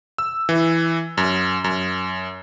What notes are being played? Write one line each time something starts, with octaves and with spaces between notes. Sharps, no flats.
E6
E3
F#2
F#2